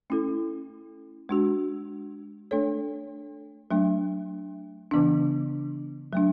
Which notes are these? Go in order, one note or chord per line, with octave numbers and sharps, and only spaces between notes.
A3 C#4 E4 A4
G#3 D4 F#4
A3 D4 A4 C#5
F#3 A3 D4
C#3 E3 B3 D4
F#3 A3 D4